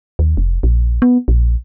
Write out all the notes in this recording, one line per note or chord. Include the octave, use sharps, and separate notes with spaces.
D#2
F1
A#1
B3
A#1